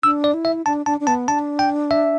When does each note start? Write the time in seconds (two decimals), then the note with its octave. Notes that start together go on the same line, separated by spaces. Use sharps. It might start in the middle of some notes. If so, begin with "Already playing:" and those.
0.03 D4 E6
0.24 D5
0.34 E4
0.45 E5
0.66 D4 A5
0.86 D4 A5
1.00 D4
1.07 B3 A5
1.28 D4 A5
1.59 G5
1.91 E5